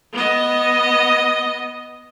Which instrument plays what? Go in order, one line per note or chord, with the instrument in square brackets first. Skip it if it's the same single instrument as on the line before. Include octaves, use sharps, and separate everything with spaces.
[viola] B3 D#5